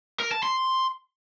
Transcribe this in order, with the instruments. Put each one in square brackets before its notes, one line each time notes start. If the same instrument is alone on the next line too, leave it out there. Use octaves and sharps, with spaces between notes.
[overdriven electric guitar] A#4
A5
C6